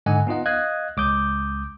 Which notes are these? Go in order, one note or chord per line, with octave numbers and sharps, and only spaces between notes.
G#2 D3 D#5 F#5 G#5
B3 D#4 F4 D#5 F#5
D#5 F5 D#6 F#6 G#6
C#2 D6 D#6 G6